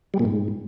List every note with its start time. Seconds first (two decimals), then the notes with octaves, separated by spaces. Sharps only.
0.14 G3
0.19 A#2
0.25 G#2